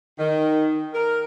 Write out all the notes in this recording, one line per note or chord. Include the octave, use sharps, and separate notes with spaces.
D#3
A#4